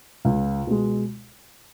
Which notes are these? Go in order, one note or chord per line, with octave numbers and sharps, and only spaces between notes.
C#2
B2 G#3